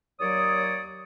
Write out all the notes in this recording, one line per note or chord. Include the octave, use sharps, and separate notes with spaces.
D#2 F#3 C#5 D5 D#6